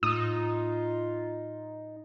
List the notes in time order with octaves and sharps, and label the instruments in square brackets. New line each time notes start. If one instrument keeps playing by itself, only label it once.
[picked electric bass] A2 [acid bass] D#4 [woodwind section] F4 [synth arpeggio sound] D#6